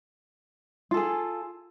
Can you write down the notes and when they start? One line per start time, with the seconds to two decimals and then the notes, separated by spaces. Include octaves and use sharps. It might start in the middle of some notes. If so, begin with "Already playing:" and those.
0.91 F4
0.94 A4
0.97 G#4